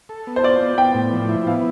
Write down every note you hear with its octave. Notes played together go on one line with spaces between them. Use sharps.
A4
B3
C5
F4 D5
B3
B3 G5
A2
F3
E4
B3 F5